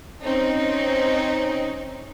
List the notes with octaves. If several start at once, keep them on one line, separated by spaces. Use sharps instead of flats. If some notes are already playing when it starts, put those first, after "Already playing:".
C4 C#4 D#4